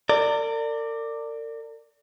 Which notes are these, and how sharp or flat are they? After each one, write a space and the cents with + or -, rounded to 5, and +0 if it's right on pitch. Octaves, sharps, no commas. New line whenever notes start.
A#4 -40 D5 +0